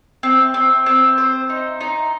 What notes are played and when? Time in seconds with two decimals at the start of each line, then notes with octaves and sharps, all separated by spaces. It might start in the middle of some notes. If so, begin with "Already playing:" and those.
0.23 C4
0.54 C4
0.86 C4
1.18 C5
1.49 D#4
1.81 D#4